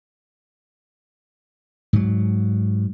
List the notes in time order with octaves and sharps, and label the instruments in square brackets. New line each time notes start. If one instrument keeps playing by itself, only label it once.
[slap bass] G#2 F#3